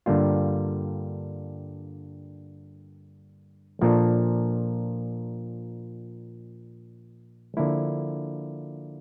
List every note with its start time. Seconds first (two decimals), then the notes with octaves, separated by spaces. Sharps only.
0.06 G2 D3 G3 A#3 F4
3.82 A#2 F3 A#3 D4 A4
7.57 D3 F3 A#3 E4